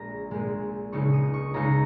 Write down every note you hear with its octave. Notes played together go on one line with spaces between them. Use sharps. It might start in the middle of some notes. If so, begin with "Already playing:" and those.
Already playing: A#1 A#2 G#3 A#5
A#1 A#2 G#3
C#2 C#3 G#3 D#4 C#6
D#6
C#6
C#2 C#3 G#3 D#4 A#5